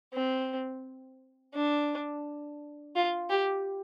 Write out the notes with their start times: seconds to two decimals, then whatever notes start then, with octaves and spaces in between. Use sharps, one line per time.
0.13 C4
1.54 D4
2.95 F4
3.29 G4